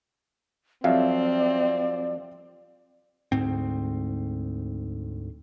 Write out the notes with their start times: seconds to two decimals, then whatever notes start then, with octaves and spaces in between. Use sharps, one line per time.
0.84 F2 F#3 G3 C4 D5 E5 F5
3.32 D2 G#2 C4